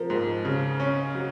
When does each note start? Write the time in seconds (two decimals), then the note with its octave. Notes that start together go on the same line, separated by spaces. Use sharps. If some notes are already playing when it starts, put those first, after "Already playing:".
Already playing: F3 A#4 C5
0.10 G#2
0.45 C#3
0.80 C#4
1.15 F#3